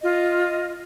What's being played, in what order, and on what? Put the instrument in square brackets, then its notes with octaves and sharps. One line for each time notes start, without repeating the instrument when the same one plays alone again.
[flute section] F4 D#5